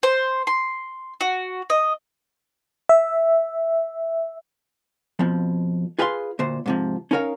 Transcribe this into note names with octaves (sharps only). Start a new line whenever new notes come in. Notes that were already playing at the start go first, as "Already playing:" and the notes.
C5
C6
F#4
D#5
E5
F2 B2 F3
F4 G#4 B4 F5 F#5 C6
D2 A#2 C5
G#2 C3 F3
C#4 D#4 E4 A#4 C#5 F5